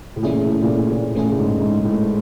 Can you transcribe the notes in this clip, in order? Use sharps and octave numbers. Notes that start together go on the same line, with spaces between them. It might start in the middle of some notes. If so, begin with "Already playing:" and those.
A2
A#2 E3 A3 C#4 E4 G#4
A2
A#2
A2
A#2
A2 E3 A3 C#4 E4 G#4
A2
G#2
G#2
A2